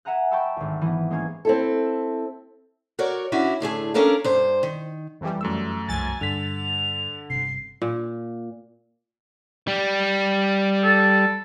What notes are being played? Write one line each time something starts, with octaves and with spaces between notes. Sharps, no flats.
E5 F#5 G#5 A#5 F#6
G5 A5 B5 C#6 E6
G#1 D2
E3 B3
G#3 A#3 C#4 G#6
C4 E4 A4
F#4 A#4 C#5 D5
C#4 D4 E4 F#4
A2 D3 A3 G#4
C#4 D4 A4 A#4 C#5 F5
G2 C5
D#3
F2 E3 G3
F#2 A3 E6
C2 G2 F3 G#5 A6
G2 D3 G3 B6 F7
G1 C3 C7
A#2
G3
A4